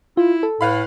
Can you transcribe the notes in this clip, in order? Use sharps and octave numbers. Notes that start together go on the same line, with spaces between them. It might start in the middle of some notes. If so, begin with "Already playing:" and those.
E4 F4
A4
A2 B4 F5 B5